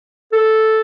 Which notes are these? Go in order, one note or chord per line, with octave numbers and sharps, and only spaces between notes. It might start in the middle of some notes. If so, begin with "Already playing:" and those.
A4